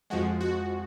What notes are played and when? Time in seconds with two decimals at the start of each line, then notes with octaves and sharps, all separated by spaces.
0.10 F2 F3 G#3 F#4
0.41 F#4